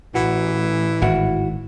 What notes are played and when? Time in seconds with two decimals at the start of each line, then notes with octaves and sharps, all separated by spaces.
0.15 A1 E3 F#4
1.02 G#1 E4 F#4